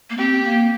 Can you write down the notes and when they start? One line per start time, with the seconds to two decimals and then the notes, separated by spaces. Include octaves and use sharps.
0.10 A#3
0.18 C4 G4
0.43 A#3